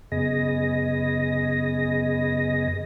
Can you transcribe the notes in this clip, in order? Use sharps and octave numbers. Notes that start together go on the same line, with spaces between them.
F#2 C#3 B3 G#4 D#5 A#6